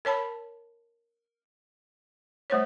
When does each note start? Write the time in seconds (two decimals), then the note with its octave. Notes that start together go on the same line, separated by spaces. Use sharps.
0.05 A#4 C#5 A5 B5
2.50 G3 A3 C5 C#5